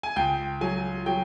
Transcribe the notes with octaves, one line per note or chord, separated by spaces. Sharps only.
G#5
C#2 G5
F#3 G#5
F#3 G5